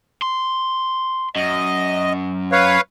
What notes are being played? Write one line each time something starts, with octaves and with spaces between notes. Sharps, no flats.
C6
F#2 D#5
B4 C#5 F5